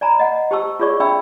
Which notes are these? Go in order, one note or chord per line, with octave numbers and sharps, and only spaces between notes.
D5 G#5 A#5 B5
D#5 F#5
G4 C5 A5 C#6 E6
F4 G#4 C#5 D5 C#6
D4 D5 E5 G5 B5 E6